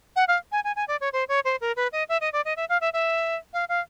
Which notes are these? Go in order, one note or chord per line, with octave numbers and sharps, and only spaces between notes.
F#5
F5
G#5
G#5
G#5
D5
C#5
C5
C#5
C5
A#4
B4
D#5
E5
D#5
D5
D#5
E5
F5
E5
E5
F5
F5